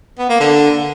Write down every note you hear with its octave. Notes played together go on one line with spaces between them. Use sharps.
B3
A#3
D3